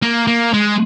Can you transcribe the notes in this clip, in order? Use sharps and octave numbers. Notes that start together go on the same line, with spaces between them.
A#3
A#3
G#3